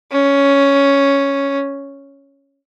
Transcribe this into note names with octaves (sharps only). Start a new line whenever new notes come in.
C#4